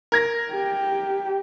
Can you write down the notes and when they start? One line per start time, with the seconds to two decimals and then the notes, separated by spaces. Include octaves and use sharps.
0.12 A#4 G#6 A#6
0.52 G4